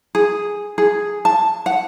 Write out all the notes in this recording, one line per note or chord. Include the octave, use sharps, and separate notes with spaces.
G#4
G#4
A5
F#5